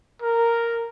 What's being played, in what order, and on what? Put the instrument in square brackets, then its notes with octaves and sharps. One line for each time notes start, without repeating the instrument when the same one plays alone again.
[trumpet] A#4